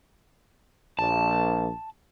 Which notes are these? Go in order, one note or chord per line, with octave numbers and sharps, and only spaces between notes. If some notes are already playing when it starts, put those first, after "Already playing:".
A#1 A5